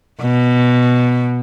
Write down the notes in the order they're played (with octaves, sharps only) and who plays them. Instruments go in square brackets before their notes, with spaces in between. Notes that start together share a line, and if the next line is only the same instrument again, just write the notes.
[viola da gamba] B2